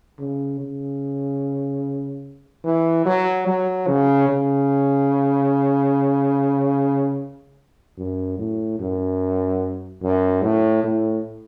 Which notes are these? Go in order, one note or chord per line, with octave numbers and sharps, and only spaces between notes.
C#3
C#3
E3
F#3
F#3
C#3
C#3
F#2
A2
F#2
F#2
A2
A2